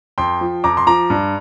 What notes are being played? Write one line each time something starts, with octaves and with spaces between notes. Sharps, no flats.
F2 G5 C6
F3
F2 A#5 D6
C6
F3 A#5 D6
G2